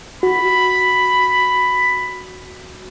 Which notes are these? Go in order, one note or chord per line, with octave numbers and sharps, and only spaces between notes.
F#4 B5